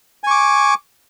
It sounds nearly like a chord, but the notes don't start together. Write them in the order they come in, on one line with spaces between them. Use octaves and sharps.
G#5 C#6 D6